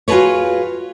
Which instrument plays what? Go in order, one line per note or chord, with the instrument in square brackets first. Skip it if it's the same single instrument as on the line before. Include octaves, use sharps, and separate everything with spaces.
[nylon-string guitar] F4 F#4 G#4 A4 B4 C#5